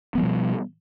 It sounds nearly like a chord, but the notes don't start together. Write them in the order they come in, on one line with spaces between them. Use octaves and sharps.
B3 F3 G3 B2